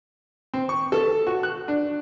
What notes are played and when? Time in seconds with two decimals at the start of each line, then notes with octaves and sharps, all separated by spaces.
0.54 C4
0.69 C#6
0.92 A4
1.27 F#4
1.43 F#6
1.68 D4